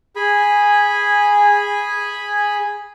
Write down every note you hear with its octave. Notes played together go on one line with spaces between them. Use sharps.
G#4 G#5 B5